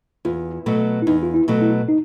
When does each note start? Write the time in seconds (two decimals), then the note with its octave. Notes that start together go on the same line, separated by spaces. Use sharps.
0.25 E2 F4
0.66 B2 F#3 A3
1.02 E4
1.07 E2 D#4
1.23 F4
1.34 E4
1.48 B2 F#3 A3
1.61 E4
1.89 D#4